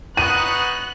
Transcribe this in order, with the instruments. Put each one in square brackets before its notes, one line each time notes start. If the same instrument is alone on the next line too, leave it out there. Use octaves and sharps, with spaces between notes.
[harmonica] B3 D#4 F#4 [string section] F#6 [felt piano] D#7